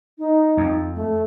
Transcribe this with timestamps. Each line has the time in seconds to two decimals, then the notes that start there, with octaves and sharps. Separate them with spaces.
0.18 D#4
0.57 F2
0.95 A3